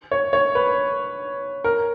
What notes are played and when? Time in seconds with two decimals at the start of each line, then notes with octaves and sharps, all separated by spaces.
0.11 C#5
0.33 C#5
0.55 B4
1.64 A#4